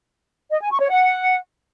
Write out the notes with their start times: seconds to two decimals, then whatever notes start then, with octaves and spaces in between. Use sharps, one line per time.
0.52 D#5
0.61 G#5
0.70 C#6
0.80 C#5
0.89 F#5